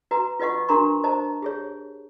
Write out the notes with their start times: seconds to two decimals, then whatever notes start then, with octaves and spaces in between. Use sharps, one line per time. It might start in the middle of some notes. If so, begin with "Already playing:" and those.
0.11 F#4 B4 A#5
0.40 F4 B4 D#5 F#5 C#6
0.69 D4 F#4 A#4 A#5 C6 C#6
1.04 C5 D#5 A5 A#5
1.42 G4 G#4 C#5